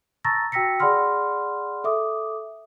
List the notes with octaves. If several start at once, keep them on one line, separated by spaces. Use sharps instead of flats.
A5 A#5 C#6 E6 A6 A#6
F#4 G5 E6 A#6 B6 C#7
G#4 D5 F#5 B5 C6 F6
A4 E5 D6 D#6